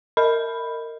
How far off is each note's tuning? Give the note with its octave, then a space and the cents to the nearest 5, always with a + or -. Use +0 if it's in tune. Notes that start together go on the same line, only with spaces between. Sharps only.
A#4 -20 D#5 +0 B5 +0